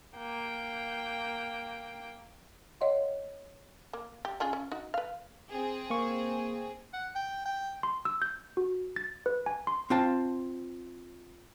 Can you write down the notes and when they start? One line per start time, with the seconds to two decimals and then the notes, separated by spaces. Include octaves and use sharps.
0.17 A#3 G5
2.81 C#5 D#5 F5 F#5 C6
3.93 A#3
4.25 G4
4.40 C#4 F4 G#4
4.53 C#4
4.72 D#4 F#4
4.94 B4 F5
5.51 C4 G#4
5.90 A#3 C#6
6.93 F#5
7.15 G5
7.45 G5
7.83 C6
8.05 E6
8.22 G6
8.57 F#4
8.96 A6
9.26 B4
9.46 G#5
9.67 C6
9.90 C4 F4 A5